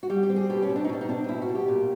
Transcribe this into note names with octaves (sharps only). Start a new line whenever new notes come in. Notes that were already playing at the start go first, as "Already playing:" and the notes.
F#4
G3 G4
G4
C4
G#4
B2 G4
C#4
C4
D4
D#4
B2 D4
D#4
C4 D4
D#4
B2 E4
F#4
B2
G4
A#2